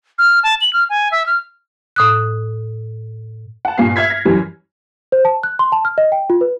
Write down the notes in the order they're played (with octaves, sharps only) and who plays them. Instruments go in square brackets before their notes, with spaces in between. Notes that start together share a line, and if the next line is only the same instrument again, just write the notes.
[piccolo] F6
A5
F#7
F6
G#5
E5
F6
[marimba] A2 D#6 F#6
[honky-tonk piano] F#5 A5
G2 A#2 F5 G#5 C7
E5 F6 G#6 B6
A#6
F#2 E3 G3
[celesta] C5
A5
F#6
C6
A5
F6
D#5
G5
F4
B4